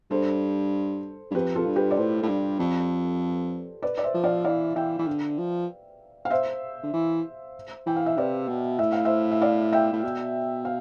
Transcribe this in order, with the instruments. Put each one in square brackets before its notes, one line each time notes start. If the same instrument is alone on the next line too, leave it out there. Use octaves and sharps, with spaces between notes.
[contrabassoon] G2 [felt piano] A4 C5
[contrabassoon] G2
[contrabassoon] F2 [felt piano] G4 B4
[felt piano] F4 A4
[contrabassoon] G2
[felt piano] G4 B4
D5
[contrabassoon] A2 [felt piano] A4 C5
[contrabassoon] A2
G2
F2
[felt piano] B4 D5
D5
C5 E5
[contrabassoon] F3
[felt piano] D5 F5
[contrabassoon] E3 [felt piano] D5 F5
[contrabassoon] E3 [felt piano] E5 G5
[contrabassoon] E3
D3
F3
[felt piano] F5
C5 E5
[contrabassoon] D3
E3
[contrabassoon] E3 [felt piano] G5
[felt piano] F5
E5
[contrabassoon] C3 [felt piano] B4 D5
[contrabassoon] B2
[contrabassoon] A2 [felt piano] E5
[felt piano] F5
C5 E5
E5
D5 F5
E5 G5
[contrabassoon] A2
B2
[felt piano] F5